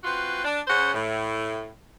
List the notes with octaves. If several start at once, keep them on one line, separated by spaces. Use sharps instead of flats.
C4 F4 F#4 B4
D4
C#3 C#4 C5 F#5
A2